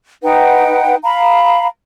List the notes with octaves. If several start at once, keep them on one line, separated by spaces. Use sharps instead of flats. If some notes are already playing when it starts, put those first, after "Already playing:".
D#4 B4 F#5 G5
F5 A#5 B5